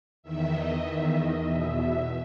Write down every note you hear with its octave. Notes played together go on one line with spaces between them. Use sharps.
E2 D#3 E5
D#5
E2 D#3 E5
D#5
E2 B2 E5